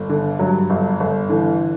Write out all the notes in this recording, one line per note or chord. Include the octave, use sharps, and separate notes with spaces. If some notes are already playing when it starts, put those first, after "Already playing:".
Already playing: G1
D3
G2 F#3
G1
G1
D3 E3